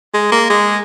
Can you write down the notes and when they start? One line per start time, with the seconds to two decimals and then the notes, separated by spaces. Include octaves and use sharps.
0.14 G#3
0.32 A#3
0.50 G#3